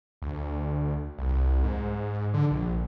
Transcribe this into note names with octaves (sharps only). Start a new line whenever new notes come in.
D2
C2
G#2
D3
A#1